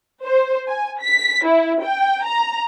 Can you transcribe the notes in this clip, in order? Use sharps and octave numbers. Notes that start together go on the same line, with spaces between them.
C5
G#5
B6
E4
G5
A#5